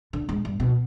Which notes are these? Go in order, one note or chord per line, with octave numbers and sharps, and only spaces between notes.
D3
G#2
G2
B2